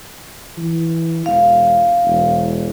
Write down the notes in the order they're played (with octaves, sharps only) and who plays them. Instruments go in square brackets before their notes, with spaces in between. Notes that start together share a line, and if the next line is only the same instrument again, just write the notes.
[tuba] E3
[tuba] E1 [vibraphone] F5
[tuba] E1